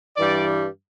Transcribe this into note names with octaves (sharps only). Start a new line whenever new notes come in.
G2 E3 G3 D5